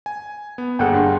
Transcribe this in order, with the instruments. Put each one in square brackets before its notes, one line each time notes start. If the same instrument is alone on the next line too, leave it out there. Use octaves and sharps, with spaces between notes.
[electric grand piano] G#5
B3
[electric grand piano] G1 A#3 A4 [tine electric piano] G#4 F#5 G5
[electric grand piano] G2 D4 C6